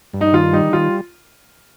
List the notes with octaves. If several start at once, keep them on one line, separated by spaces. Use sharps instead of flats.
G2
D#4
D#3 F4
G3 D#4
D#3 F4